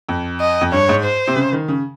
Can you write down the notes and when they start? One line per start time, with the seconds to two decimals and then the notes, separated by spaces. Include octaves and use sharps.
0.09 F2
0.41 D#5
0.61 F2
0.72 G2 C#5
0.89 G#2
1.04 C5
1.28 C3
1.36 C#3
1.52 D#3
1.68 C#3